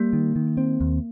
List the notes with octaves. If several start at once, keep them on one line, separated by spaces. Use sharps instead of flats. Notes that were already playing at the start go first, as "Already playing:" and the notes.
Already playing: G3 A#3
D#3
D#3
C4
D#2